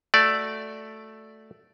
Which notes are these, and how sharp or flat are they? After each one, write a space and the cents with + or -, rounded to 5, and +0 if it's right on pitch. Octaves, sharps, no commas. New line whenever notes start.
A3 +0 F#4 +0 D5 +0